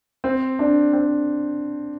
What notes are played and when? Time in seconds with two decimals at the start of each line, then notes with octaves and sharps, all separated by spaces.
0.24 C4
0.59 D4
0.93 C4